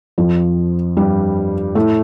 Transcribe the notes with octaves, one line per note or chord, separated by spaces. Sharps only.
F2 F3
G2 G3
A2 A3